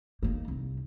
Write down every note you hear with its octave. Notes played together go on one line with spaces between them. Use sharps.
A#3 D#4
C2